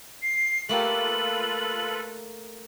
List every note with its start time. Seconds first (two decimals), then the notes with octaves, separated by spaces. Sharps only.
0.22 C7
0.69 A3 A#3 F4 G4 A4 B4 F#7